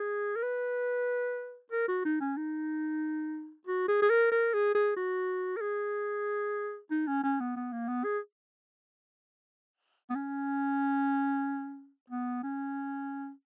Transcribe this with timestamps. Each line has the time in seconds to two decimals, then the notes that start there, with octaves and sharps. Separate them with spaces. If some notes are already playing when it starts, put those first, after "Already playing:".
Already playing: G#4
0.36 A#4
0.43 B4
1.72 A#4
1.88 F#4
2.05 D#4
2.20 C#4
2.37 D#4
3.67 F#4
3.88 G#4
4.02 G#4
4.10 A#4
4.31 A#4
4.54 G#4
4.75 G#4
4.96 F#4
5.57 A#4
5.61 G#4
6.91 D#4
7.07 C#4
7.24 C#4
7.40 B3
7.56 B3
7.72 A#3
7.88 B3
8.04 G#4
10.10 B3
10.15 C#4
12.10 B3
12.43 C#4